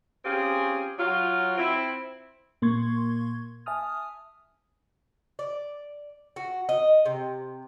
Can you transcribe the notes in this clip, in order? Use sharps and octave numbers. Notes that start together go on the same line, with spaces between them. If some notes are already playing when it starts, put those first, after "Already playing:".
C4 C#4 F4 G4 G#4
F#3 F4
C4 E4
A#2 A#3 C6 C#6 G#6
E5 G#5 A5 D#6 F6
D5
F#4
D#5
C3